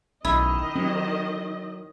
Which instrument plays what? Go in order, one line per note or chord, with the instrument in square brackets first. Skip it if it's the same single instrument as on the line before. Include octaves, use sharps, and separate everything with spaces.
[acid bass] B1 [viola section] D#3 D#5 [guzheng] E4
[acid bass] F#3 [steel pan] C4